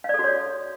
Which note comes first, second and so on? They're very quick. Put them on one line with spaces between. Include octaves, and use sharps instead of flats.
F5 D5 A4 F#4 C#5